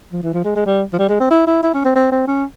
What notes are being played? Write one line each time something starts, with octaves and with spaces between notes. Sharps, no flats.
F3
E3
F3
G#3
G#3
G3
F3
G3
G#3
C4
E4
E4
E4
C#4
C4
C4
C4
C#4